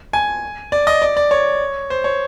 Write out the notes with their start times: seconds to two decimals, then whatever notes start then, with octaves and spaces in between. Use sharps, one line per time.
0.13 G#5
0.72 D5
0.87 D#5
1.02 D5
1.17 D5
1.31 C#5
1.90 C5
2.04 C#5